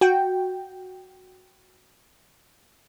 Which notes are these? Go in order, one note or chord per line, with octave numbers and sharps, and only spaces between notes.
F#4 G5